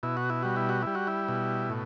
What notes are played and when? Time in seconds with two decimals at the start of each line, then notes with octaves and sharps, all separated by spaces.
0.03 B2 E4
0.17 F#4
0.30 E4
0.43 G3 F#4
0.56 E4
0.69 F#4
0.82 G3 E4
0.95 F#4
1.07 E4
1.28 B2
1.70 A2